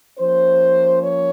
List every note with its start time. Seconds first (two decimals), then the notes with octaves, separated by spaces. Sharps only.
0.18 F3 A#3 C#4 C5
1.02 C#5